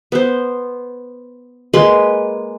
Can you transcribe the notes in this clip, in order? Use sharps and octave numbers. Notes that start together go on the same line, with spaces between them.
B3 C5
G#3 A#3 B4 C6